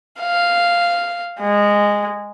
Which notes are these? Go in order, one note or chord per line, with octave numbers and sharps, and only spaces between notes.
F5
G#3